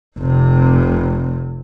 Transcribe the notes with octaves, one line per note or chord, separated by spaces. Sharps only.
F1 C3